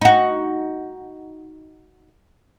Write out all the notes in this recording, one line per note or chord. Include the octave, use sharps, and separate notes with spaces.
D#4 F#4